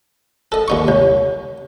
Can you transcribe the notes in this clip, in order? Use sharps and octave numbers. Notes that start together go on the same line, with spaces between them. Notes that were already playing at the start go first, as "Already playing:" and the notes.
A4 D#5
D#2 D#4 C#6
C2 C#5